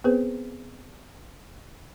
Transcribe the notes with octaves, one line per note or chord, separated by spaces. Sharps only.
B3 C4 G#4 B4 C5